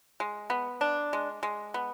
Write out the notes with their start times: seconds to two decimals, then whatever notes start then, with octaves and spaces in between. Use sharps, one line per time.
0.20 G#3
0.50 B3
0.81 D4
1.13 G#3
1.43 G#3
1.74 B3